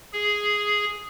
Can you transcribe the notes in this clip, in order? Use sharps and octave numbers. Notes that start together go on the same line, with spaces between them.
G#4